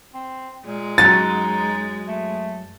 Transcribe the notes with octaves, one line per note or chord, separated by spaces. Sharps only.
C4
A#2 G#3
F#2 F#3 C#4 D#4 A6
A3